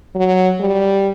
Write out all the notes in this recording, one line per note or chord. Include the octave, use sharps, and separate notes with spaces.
F#3
G3